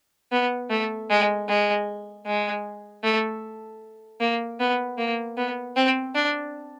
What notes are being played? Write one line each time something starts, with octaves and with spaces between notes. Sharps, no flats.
B3
A3
G#3
G#3
G#3
A3
A#3
B3
A#3
B3
C4
D4